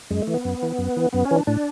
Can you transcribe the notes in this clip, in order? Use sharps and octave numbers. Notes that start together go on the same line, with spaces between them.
F#2 G#3
A3
E3
B3
F#2
E3
F#2
E3
F#2 B3
C#4
E3
D4
A2 D4